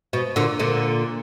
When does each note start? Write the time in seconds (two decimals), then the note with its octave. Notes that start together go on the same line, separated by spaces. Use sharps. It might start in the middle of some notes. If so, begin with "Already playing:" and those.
0.13 B2
0.36 A#2 D3
0.59 A#2 D3